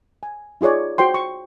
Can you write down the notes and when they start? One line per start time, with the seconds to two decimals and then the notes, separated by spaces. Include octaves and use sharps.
0.23 G#5
0.61 D#4 F4 G#4 C#5 D5
0.98 F#4 C5 G5 C6
1.14 C#6